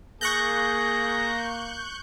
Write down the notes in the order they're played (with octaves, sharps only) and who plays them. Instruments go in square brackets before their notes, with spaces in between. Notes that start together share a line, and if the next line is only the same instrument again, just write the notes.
[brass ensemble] A#3 [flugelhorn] G#4 [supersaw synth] C#6 F#6 G6 [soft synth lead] A#6